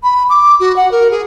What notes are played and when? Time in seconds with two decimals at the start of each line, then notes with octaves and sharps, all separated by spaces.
0.03 B5
0.29 D6
0.60 F#4
0.76 F#5
0.91 A#4
1.11 G#4